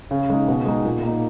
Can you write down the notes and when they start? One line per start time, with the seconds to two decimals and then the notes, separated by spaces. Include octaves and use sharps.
0.11 C#3
0.30 G#3 D#4
0.48 B2
0.66 G#3 D#4
0.85 A#2
1.03 A#3 D#4